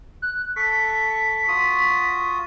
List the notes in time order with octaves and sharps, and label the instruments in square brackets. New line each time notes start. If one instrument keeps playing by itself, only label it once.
[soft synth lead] F#6
[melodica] A4 C#6 [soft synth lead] B6
[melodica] F4 F#4 D#6